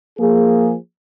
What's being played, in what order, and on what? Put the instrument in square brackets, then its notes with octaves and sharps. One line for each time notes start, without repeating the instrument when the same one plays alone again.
[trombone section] F3 A#3 G#4